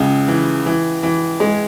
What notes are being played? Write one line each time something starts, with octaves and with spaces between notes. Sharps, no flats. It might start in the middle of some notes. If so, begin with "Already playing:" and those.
Already playing: C#2 C#3
E3
E3
E3
G#3